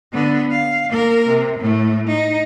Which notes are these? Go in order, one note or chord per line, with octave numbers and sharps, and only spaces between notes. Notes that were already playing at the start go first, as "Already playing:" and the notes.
D3 B3
F5
A#3 A#4
C3
A2 A3
D#4